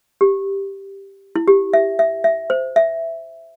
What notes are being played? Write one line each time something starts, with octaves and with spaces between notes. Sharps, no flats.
G4
E4
G4
E5
E5
E5
C5
E5